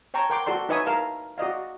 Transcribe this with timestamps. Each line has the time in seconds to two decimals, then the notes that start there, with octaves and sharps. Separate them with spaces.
0.14 C#5 G5 A5 A#5 C#6
0.30 A#4 F#5 G5 C6 D6
0.46 F#4 A4 D5 C6
0.69 D#4 B4 C#5 E5 G#5 D#6
0.86 A#4 F5 A5
1.38 F#4 D5 D#5 F5